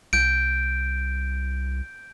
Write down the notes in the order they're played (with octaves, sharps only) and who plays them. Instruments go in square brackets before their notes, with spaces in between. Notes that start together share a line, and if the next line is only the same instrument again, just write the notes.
[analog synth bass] C2 [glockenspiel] G6 D7